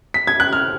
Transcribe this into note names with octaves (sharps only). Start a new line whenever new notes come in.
B6
G#6
F#6
F6